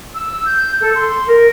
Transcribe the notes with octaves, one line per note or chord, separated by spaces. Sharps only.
E6
G6
A4
C6
A#4